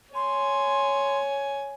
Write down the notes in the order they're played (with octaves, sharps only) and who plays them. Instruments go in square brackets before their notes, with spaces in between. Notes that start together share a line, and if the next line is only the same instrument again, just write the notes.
[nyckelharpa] C#5 G#5 [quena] C6